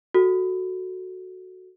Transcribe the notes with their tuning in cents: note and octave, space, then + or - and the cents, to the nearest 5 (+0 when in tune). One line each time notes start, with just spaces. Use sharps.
F#4 +0 A4 +0